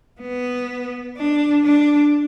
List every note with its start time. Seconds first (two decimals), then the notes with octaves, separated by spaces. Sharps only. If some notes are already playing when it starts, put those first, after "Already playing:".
0.21 B3
1.16 D4
1.64 D4